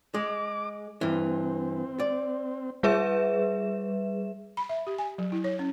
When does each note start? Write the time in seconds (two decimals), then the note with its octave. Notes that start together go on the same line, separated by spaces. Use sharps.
0.14 G#3 D6
1.01 G2 E3 C4
2.00 D5
2.83 G3 G#4 B4 E5 E7
4.57 B5
4.69 E5
4.87 G4
4.98 G#5
5.18 F#3
5.32 E4
5.44 C#5
5.59 C#4